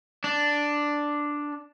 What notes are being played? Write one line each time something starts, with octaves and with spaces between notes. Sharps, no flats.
D4